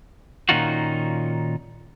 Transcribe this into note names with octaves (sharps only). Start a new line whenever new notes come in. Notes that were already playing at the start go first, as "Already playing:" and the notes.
A#2 D#3 C#4 D#4 F4 F#4